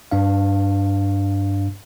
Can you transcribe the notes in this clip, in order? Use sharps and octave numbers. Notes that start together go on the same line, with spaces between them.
G2 D4 F5